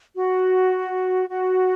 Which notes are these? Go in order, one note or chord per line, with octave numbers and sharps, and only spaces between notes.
F#4
F#4